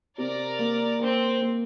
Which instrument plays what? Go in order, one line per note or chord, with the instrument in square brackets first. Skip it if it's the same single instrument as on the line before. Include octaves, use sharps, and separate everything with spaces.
[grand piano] C3 [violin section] A#4 D5
[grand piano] A#3
[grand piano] A#3 [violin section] C4
[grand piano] A#3